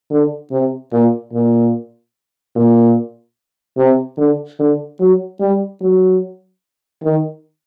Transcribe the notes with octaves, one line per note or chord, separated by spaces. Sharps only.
D3
C3
A#2
A#2
A#2
C3
D3
D3
F#3
G3
F#3
D#3